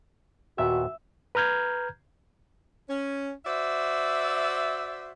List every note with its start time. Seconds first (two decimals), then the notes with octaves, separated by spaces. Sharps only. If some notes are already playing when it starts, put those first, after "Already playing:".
0.58 D#2 A#2 B3 F#4 E5
1.35 B4 A#5 F6 G6 G#6
2.89 C#4
3.46 F#4 C5 D5 E5